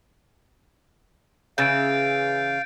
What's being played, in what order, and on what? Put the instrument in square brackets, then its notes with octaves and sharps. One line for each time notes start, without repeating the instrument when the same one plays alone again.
[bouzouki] C#3 E3 [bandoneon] F5 [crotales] G6 A6 D7